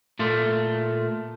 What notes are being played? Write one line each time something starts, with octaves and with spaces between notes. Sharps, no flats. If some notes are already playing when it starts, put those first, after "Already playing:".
A#2 A3 F4